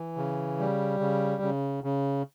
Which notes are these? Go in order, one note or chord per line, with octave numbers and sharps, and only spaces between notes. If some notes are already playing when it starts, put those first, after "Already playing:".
Already playing: E3
C#3
G3
C#3
C#3
C#3